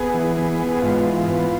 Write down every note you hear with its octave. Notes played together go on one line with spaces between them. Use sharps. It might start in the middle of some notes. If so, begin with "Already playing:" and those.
Already playing: B3 G#4
E3
B3
B3
G#4
G#2 F4
E3
B3